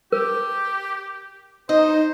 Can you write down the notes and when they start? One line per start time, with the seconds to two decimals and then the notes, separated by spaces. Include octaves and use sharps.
0.12 G4 A#4
1.69 D#4 C5 D#5